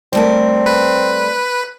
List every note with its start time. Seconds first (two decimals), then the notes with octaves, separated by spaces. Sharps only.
0.13 G3 A3 C4 A#4
0.66 B4